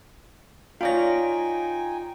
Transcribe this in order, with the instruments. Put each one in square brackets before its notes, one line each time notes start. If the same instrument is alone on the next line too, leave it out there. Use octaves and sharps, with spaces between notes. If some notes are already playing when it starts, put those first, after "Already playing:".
[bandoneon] D#4 G5 G#5 [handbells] F4 A#6 [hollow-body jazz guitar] C#5 D5 F5